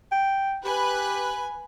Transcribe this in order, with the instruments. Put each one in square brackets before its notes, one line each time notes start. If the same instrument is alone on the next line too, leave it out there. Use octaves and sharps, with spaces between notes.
[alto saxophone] G5
[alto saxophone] G4 [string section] B4 F#6 [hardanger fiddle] G#5